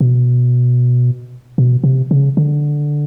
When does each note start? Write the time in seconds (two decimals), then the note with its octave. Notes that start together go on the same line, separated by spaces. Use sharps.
0.01 B2
1.58 B2
1.84 C3
2.11 C#3
2.37 D3